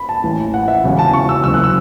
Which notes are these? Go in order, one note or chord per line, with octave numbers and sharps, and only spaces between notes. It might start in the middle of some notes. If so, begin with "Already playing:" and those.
Already playing: B5
A5
A1 A2 E3
F#5
F#5
E5
E1 E2 C#3 E3
A5
C#6
E6
F#1 F#2 C#3 E3 E6
F#6
E6